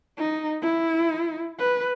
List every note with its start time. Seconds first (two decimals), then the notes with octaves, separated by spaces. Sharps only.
0.18 D#4
0.61 E4
1.59 B4